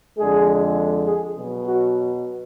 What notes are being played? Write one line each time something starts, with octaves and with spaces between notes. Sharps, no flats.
F2 D3 G#3 G#4
G#4
B2 F#3
F#4